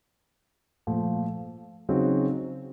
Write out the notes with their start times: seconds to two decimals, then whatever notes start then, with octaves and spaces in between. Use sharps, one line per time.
0.87 A#2 F3 A3
1.89 C#3 F#3 C4 D#4 F#4